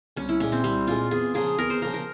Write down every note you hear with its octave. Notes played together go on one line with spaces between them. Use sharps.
C2 C#4
E4
A#2 G#3 C#4
C4
C2 G3
A#2 G#3 F4
E2 G#4
C#3 F3 A#3 G#4
E2 A#4
C5
C#3 F3 A#3 A#4
A#4